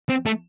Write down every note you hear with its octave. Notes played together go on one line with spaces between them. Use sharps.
C4
A3